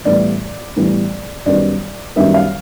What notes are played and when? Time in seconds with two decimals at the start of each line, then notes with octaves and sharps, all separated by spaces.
0.05 A2 E3 G3 B3 D5
0.76 A2 E3 G3 B3
1.46 F#2 D#3 G3 B3 D5
2.16 F#2 D#3 G3 B3 E5
2.34 F5